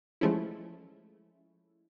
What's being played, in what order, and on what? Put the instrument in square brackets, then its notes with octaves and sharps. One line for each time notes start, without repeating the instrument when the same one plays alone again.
[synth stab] F3 G#3 A3 C#4 E4